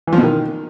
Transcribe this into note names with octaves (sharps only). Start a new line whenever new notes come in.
E3
F3
B2
D#3